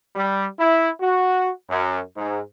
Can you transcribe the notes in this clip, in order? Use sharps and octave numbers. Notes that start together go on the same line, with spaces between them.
G3
E4
F#4
F#2
G#2